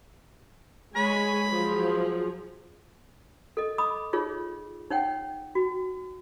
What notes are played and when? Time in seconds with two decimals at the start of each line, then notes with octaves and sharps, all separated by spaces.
0.96 G#3 C#5 G#5 B5
1.49 F3 F#3 G#4
3.57 A4 D#5
3.78 D#5 B5 D6 D#6
4.13 D#4 F4 G#4 C#5
4.90 D#4 C#5 F#5 G5
5.55 F#4